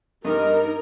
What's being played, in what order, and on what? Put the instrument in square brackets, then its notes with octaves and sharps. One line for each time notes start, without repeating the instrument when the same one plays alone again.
[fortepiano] G2 [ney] D#4 [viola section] A#4 [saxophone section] D#5